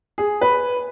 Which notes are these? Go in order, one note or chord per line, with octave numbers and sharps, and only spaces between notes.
G#4
B4